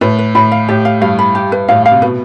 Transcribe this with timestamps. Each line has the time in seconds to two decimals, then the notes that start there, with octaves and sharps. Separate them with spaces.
0.01 A2 B4
0.19 B4
0.35 A2 B5
0.52 F5
0.68 A2 G4
0.85 F5
1.01 G2 F5
1.19 B5
1.35 G4
1.52 B4
1.68 A2 F5
1.86 F5
1.92 C3
2.02 B2 B4